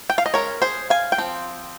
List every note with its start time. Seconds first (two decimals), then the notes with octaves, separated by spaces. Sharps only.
0.10 G5
0.18 F5
0.26 D#5
0.34 G#3 C#4 A#4 C#5
0.62 G#4 C5
0.90 F5 G#5
1.12 G5
1.18 F3 C4